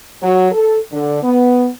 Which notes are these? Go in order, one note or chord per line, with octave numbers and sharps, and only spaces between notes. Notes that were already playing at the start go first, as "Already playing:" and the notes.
F#3
A4
D3
B3